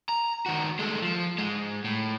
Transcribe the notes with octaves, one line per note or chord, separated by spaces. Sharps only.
A#5
D#3 F#4
G#3 A3
F3
G#2 G#3
A2